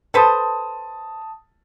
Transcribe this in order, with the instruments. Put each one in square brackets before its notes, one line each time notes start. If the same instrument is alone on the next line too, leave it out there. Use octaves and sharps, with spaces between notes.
[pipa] A4 B4 C5 [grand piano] A5 D#6